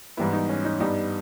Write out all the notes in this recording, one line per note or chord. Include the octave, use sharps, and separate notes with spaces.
G#2 E3 G3 B3 E4
D#4
C#4
D#4
G2 G3 B3 D#4